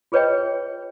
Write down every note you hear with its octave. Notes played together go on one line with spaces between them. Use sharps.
F4 G#4 B4 C#5 D#5 G5